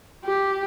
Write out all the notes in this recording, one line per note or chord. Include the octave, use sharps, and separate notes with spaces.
G4